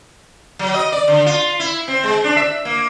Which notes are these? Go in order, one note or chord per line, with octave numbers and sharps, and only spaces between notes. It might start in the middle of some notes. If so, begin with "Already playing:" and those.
F#3
D#5
D5
D3
F4
E4
C4
G#3
D4
E5
A#3